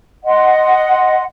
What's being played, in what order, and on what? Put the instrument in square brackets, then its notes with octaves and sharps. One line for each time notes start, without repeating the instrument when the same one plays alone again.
[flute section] D#5 F#5 C6